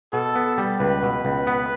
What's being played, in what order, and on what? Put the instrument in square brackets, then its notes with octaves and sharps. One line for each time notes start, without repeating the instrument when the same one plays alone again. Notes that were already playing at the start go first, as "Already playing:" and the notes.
[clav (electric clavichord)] B2 [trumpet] A4
[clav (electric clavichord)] B3
G3
[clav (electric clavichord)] C#2 [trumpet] B4
[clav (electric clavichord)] B2
C#2
B3